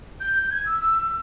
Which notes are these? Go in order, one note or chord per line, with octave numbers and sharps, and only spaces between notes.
G6
G#6
E6
E6